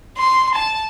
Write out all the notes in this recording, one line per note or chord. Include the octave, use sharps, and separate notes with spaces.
C6
A5